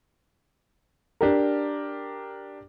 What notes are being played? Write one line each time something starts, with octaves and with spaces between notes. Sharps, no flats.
D4 G4 A#4